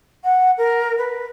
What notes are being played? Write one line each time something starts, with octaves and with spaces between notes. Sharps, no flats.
F#5
A#4
B4